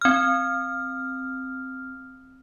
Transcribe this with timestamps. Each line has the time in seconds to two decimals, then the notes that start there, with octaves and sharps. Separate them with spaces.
0.01 C4 F6